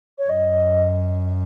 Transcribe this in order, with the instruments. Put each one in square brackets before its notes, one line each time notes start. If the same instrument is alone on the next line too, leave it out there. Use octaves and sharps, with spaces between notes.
[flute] C#5
[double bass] F#2 [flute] D#5